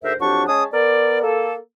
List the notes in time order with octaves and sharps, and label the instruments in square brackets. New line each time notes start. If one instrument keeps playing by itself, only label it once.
[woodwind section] D2 G#2 A#4 C5 E5
F2 F#3 D4 G4 C#6
G#3 C#4 G#4 A5 D#6
B3 A#4 D5
A#3 A4